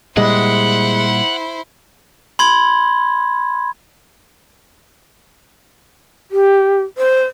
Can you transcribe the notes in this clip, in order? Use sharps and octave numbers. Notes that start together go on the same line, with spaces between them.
A#2 G3 G#3 E4 C5 F#5
B5 C6 G#6
G4
C5